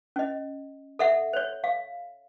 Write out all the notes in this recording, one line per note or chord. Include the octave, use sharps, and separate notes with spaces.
C#4 D#5
A4 E5 F#5
C5 C#5
F5